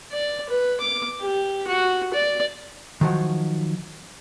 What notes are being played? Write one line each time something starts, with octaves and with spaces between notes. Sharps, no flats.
D5
B4
D6
G4
F#4
D5
D#3 F3 F#3